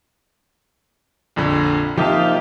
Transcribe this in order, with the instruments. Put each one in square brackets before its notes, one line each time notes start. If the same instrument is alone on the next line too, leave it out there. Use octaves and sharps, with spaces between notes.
[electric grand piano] A#1 F2 D3
[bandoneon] C3 A#3 [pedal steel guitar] F3 D#4 F5 [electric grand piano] G4 A5